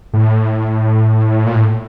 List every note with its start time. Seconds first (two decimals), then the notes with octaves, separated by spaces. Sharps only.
0.13 A2
1.46 A#2
1.55 A2